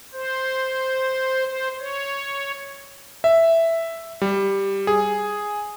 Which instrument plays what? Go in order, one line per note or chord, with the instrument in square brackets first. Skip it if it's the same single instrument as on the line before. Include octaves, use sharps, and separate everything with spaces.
[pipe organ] C5
C5
C#5
[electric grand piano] E5
G3
G#4